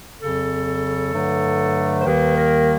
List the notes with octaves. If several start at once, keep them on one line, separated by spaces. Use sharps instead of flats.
F2 C#3 F#3 A4
G2 D3 F#3 A3
C5
D#2 D#3 G3 A#3 B4
A#4